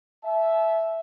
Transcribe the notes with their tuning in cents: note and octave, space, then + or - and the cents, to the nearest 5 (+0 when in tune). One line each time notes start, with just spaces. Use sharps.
E5 +0 A5 -35